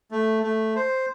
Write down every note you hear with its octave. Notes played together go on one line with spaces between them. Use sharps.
A3
A3
C5